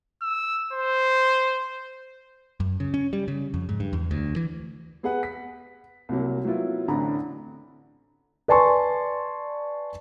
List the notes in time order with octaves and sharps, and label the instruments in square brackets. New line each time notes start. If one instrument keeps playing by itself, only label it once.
[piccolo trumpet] E6
C5
[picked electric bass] F#2
C#3
C#4
G3
C#3
F2
G#2
G2
E2
D2
E3
[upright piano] B3 G#4 B4 F#5
B6
C2 C3 F#3 A#3
F#3 A#3 B3 E4 F4
A1 D3 C4 D4 A#5 B5
[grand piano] B4 D5 G#5 A5 C6 C#6